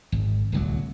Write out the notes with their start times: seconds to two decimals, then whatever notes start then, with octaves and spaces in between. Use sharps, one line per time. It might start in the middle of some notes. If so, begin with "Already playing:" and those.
0.12 G#1
0.52 D1 C2 F#3